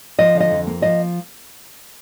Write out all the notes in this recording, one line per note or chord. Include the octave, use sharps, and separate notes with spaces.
F3 D#5
D3
D#5
F2
A#3
F3 D#5